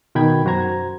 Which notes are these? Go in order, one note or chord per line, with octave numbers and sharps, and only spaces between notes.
B2 D#3 G5 B5 G#6
F#2 F#4 C5 A#5 G#6